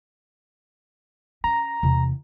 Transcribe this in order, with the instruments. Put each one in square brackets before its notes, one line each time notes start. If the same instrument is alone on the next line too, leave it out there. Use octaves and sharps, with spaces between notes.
[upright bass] C#4 [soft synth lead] A#5
[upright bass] E2 C3